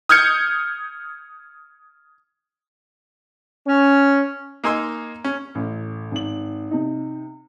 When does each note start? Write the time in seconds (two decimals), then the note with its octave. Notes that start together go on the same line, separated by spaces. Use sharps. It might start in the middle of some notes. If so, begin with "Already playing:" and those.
0.09 D#6 F6 G6 G#6 C#7
3.68 C#4
4.64 A#3 D#4 G#5 C6 E6
5.25 C#4
5.55 A1
6.11 G#1 F#7
6.71 C3 D#4